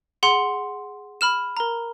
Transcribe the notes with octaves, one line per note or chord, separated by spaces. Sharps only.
G#4 F#5 C6
B5 F6 E7
A#4 A#5